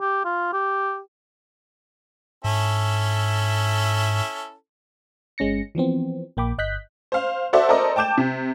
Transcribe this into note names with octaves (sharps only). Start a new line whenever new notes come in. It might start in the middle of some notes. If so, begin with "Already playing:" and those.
G4
F4
G4
G#2 C#4 E4 A4
G1 G#3 C#4 A#6 C#7
E3 F3 B3 C4
A#1 A#3 G5 B5 D6
G1 D#5 F#6 G6 B6
C5 F5
F#4 A4 C5 D5 E5
A4 A#4 C5 D5 D#5
G5 A5 D6 G6 E7
C3